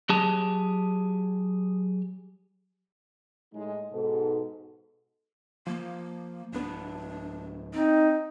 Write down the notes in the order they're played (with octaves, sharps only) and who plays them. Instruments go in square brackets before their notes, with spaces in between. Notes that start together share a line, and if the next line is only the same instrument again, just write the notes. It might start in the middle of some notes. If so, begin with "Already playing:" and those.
[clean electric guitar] F#3 G4 G#4 A5
[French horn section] A2 G#3 D#4
G#2 B2 A4
[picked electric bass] F3 [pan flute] A#3
[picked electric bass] D1 B3 [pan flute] D4
[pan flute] C4 [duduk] D#4